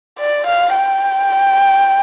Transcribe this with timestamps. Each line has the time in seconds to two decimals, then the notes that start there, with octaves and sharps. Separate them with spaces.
0.19 D5
0.47 F5
0.75 G5